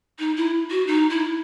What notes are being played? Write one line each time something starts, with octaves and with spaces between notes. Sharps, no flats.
D#4
E4
F#4
D#4
E4